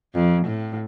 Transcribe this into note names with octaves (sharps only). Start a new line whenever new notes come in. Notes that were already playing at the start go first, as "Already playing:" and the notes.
F2
A2